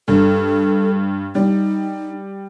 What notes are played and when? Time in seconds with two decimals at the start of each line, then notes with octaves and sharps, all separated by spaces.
0.08 G2 A4
1.35 G3 D#4